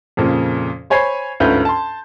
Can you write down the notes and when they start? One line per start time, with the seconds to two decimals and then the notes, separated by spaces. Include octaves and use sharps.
0.17 F2 A#2 C#3
0.90 C5 C#5 G#5 B5 G#6 C7
1.40 D2 G#2 C#4 F4 B4 G6
1.65 A5 C6